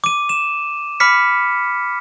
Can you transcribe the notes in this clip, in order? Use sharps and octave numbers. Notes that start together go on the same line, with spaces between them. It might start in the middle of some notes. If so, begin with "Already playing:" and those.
D6 D#7
E7
B5 D6 F6 B6 C#7